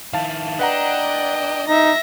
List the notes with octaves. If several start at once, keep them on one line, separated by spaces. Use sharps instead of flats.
D#3 E4 F5 A5
D4 B4 D#5 F#5 G5 A#5
D#4 E5 A#6